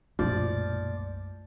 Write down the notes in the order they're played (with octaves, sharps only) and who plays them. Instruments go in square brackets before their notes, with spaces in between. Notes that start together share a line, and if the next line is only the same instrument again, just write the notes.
[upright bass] B1 A#2 [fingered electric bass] F#2 G#3 A3 [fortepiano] F3 [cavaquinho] D5